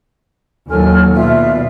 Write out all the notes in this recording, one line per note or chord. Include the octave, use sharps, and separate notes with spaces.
D#2 F#3 A4 G#5 F6
B2 F4 D5 E5